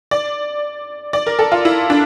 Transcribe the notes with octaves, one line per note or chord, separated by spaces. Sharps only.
D5
D5
A#4
A4
F4
E4
D4